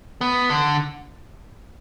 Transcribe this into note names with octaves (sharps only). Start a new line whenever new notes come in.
B3
D3